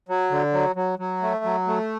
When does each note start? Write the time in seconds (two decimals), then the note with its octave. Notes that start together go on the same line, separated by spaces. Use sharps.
0.09 F#3
0.31 D3
0.53 F#3
0.76 F#3
0.99 F#3
1.22 A3
1.44 F#3
1.67 A3